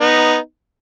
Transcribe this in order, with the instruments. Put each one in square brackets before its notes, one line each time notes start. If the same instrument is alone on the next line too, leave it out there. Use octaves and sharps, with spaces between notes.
[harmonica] B3 D#4